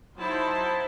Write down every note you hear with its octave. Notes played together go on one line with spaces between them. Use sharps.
F#3 D#4 E4 C5 A5